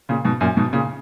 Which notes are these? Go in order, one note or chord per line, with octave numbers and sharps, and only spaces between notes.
A#2 C#3
G#2 B2
F#2 A#2
G#2 B2
A#2 C#3